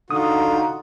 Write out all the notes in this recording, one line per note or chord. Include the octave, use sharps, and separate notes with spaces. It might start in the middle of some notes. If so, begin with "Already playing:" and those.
D3 D#4 F4 F#4 D#6